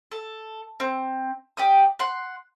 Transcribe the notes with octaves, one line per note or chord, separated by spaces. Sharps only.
A4
C4
G4 D5 D#6
F#5 C6